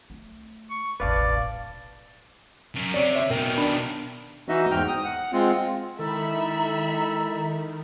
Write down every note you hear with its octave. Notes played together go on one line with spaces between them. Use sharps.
A3
C#6
E1 A1 B4 D5 F5 A5
F#2
C3 C#5 D5
C#5 E5
B2 D#3 A#4 G5
D4 B5
E3 D#4 F#4 D#5 E5
E2 G#2 G5 F6
D#6
F#5
G#3 C4 F4
D#3 G#3 E4 A4 E5 A#5 B5